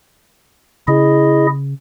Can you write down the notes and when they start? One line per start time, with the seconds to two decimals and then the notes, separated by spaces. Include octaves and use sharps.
0.88 C#3 E4 G#4 D#5